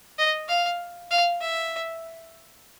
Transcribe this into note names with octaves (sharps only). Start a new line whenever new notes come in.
D#5
F5
F5
E5